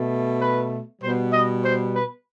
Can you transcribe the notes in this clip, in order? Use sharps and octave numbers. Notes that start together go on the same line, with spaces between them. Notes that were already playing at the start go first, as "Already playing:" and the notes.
Already playing: B2 A3
B4
B2 G3 B3 C5
D#5
C5
B4